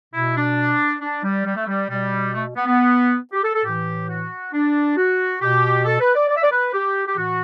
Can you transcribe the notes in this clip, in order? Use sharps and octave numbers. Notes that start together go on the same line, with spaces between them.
B2 E4
D4
D4
G3
G3
A3
G3
B2 G3
A3
B3
B3
G4
A4
A4
A2 E3 G4
F#4
D4
F#4
B2 G4
A4
B4
D5
D5
E5
D5
B4
G4
G4
A2 E3 F#4